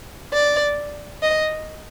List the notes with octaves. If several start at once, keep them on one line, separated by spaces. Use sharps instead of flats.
D5
D#5